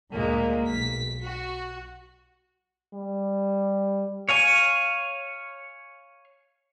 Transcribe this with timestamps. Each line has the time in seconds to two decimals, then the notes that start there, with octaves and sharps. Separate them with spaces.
0.13 D2 A#2 G#3 A#3
0.68 B1 B6
1.23 F#4
2.94 G3
4.29 C#5 F5 G#5